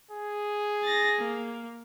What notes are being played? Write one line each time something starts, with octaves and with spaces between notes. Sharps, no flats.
G#4
A6 A#6
A#3